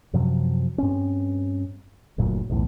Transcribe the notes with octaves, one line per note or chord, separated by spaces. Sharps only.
F#2 C3 F3 F#3
G2 C4 C#4
F#1 D2 A#2 F#3
B1 E2 A2